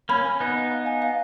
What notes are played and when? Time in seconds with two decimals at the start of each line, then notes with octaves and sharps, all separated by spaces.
0.09 A#3 C#4 B5
0.25 G#5
0.40 B3 D#4 G#5
0.56 F5
0.72 F5
0.86 G#5
1.02 F5